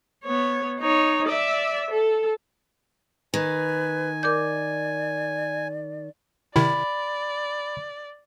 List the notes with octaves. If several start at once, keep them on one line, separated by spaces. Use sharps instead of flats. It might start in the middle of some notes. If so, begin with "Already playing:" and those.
B3 C#5
D#4 C#5
D5 E5
A4
D#3 B4 G#5
A#4 D5 D6 G6
C3 D#3 E4 D5 B5